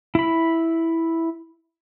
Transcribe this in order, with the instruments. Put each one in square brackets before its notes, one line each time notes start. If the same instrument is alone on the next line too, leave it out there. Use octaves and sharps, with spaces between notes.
[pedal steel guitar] E4 B5